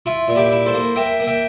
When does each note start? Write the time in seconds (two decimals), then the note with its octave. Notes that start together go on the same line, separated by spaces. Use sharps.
0.06 E4 F4
0.28 A#2
0.35 E4 G4
0.52 E4
0.66 A4 C5
0.74 A#3
0.96 A#3 E5 G5
1.20 A#3
1.27 E5 G5